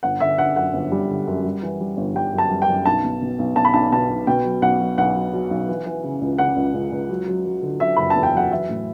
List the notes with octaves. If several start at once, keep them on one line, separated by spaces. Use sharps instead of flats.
G1 F#5
D3 E5
D3 F#5
F#2 F#5
G1
G3
D3
F#2
G3
E3
G3
G1
G3 G5
F#2
A5
G3
G5
F#2
B1 A5
B2
B2
B1
B1 A5
B5
B1 A5
B2 A5
B1
B2 G5
F#3
B1 F#5
F#3
B1 F#5
F#3
F#3
B1
E3
E3
C#3
C#2
C#3 F#5
C#2
C#2
C#2
F#3
F#3
F#3
D3
F#3 E5
F#1 B5
A5
E2
G5
F#3 F#5
E3 E5
A2